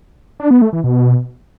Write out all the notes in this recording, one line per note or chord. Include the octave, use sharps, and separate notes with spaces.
D4
B3
A3
E3
B2